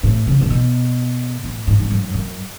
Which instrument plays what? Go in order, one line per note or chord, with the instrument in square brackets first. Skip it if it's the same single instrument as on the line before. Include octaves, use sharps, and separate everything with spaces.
[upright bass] A2
C#3
C#3
B2
A2
G#2
G#2
F#2
F#2